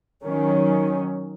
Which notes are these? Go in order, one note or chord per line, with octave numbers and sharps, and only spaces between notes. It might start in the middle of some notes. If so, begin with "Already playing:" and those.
D#3 F#3 C#4